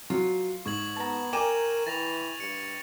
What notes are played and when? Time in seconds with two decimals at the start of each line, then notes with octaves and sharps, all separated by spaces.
0.10 F#3 F4
0.66 G#2 C#6 G#6 F#7
0.96 B3 A5 A#5
1.33 A#4 D5 G5 G#5 A#5 D#7 E7
1.87 E3 A6 A#6 F7
2.40 G2 C#7